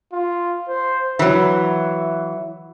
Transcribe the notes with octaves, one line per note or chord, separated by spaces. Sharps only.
F4
C5
E3 F#3 E5